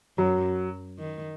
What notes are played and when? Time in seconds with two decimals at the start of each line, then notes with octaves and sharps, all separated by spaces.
0.18 F#2 F#3
0.99 D#3